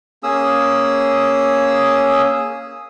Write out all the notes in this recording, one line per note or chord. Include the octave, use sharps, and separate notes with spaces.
A#3 C#4 G#4 D#6 E6